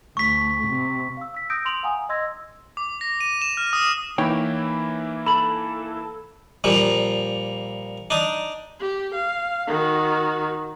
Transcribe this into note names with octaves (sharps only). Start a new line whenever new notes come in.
D2 C#6 B6
C3
F5 E6
E6 B6
D#6 E6 G6 A#6 D7
C6 D#6 D7 F7 F#7
F5 F#5 G#5 A#5 D#6
D#5 C6 E6 G#6 A#6
D6
A#6
D#7
E7
F6
D#6
E3 A#3 D#4 E4 C#5 G5
A4 B5 F#7
A#2 F3 G3
D4 D#4 D#6
G4
F5
D#3 F#4